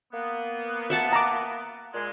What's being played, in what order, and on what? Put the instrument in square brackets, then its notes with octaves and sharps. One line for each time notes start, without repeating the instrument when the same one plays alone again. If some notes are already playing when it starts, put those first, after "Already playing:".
[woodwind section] A#3 B3
[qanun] E5 F#5 A5
[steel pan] A#5 D6
[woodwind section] A#2 G#3